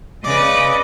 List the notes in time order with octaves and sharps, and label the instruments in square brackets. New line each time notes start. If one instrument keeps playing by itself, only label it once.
[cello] C#3 D#5 [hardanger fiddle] B4 D5 [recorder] D6